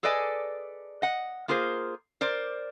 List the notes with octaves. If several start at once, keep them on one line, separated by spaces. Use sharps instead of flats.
G#4 A4 B4 D5 D#5 G#5
D#5 F#5
A#3 F4 G#4 A#4 C5
A#4 C5 D5